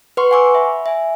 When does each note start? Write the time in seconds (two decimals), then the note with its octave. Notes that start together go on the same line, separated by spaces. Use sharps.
0.17 B4 F#5 C6 C#6
0.31 F#5 G#5 C#6 D6 E6
0.55 E5 B5
0.86 E5 G#5